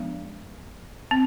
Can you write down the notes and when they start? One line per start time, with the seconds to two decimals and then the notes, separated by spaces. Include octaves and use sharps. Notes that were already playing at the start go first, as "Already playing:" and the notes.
Already playing: F3 G#3 B3 D4
1.11 C4